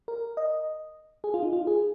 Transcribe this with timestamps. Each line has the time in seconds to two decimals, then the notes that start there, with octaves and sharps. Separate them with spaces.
0.08 A#4
0.37 D#5
1.24 G#4
1.34 F4
1.43 D#4
1.53 F4
1.67 G#4